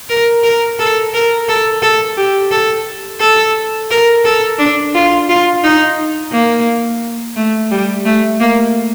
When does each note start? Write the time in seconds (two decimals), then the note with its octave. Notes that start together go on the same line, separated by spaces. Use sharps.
0.09 A#4
0.43 A#4
0.79 A4
1.14 A#4
1.48 A4
1.82 A4
2.17 G4
2.51 A4
3.20 A4
3.91 A#4
4.25 A4
4.59 D4
4.94 F4
5.29 F4
5.63 D#4
6.32 A#3
7.36 A3
7.71 G3
8.05 A3
8.40 A#3